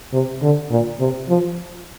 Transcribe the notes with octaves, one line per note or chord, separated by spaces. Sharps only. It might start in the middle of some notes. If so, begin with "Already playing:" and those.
C3
D3
A#2
C3
F3